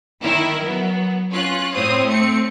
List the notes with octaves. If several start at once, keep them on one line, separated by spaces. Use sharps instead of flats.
D#3 E4 A#4
F#3 B3
C#4 F4 F#6
A2 C4 C5 C#5 D#6
A3 C4 C#7